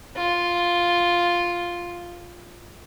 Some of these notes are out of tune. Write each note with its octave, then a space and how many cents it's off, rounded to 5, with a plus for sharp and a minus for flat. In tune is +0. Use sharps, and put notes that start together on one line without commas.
F4 +0